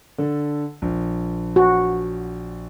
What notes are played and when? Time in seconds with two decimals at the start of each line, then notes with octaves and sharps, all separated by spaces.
0.18 D3 A4
0.82 A#1
1.56 F#4